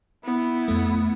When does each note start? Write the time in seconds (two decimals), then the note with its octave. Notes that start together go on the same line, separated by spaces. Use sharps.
0.25 B3 E4
0.68 F2 A3